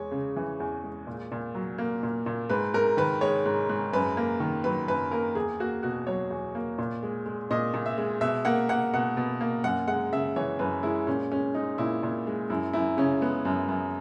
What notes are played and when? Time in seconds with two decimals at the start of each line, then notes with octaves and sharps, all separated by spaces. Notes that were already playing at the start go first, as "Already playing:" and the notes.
Already playing: E2 G#3 C#5
0.11 C#3
0.36 E3
0.60 E2
0.84 G#3
1.07 A#2
1.32 A#2
1.55 F#3
1.78 A#3
2.03 A#2
2.26 A#2
2.49 G#2 B4
2.74 G#2 A#4
2.97 D#3 B4
3.21 G#3 C#5
3.46 G#2
3.69 G#2
3.93 F#2 B4
4.17 A#3
4.40 D#3
4.64 F#3 B4
4.88 F#2 B4
5.11 A#3 A#4
5.35 E2 G#4
5.60 A#3 F#4
5.83 B2 F#4
6.07 F#3 C#5
6.30 E2
6.55 A#3
6.78 A#2
7.03 G#3
7.26 G#3
7.51 A#2 D#5
7.74 A#2
7.86 E5
7.98 G#3
8.21 B2 E5
8.45 A#3 F#5
8.69 A#3 F#5
8.93 B2 F#5
9.17 B2
9.41 A#3
9.64 F#2 F#5
9.88 G#3 F#5
10.12 C#3 E5
10.36 E3 C#5
10.59 F#2 B4
10.83 G#3 E4
11.07 A#2 C#4
11.31 G#3 C#4
11.54 G#3 D#4
11.78 A#2 E4
12.03 A#2
12.27 G#3
12.50 F#2 E4
12.73 F#2 E4
12.97 C#3 C#4
13.21 G#3 B3
13.45 F#2
13.69 F#2